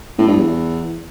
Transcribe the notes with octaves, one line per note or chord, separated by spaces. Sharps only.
A2
G2
E2